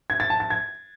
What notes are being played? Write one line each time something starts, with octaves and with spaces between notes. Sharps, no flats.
G#6
A6
A5
A6
G#6